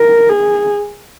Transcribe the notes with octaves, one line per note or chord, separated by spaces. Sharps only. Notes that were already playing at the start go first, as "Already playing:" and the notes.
Already playing: A#4
G#4